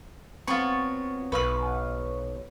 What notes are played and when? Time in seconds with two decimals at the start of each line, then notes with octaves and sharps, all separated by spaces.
0.47 F#3 B3 C4 F4 C#6 C#7
1.32 B1 B4 F5 C#6 F#6